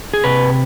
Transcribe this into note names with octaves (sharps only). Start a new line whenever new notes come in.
G#4
C3 B4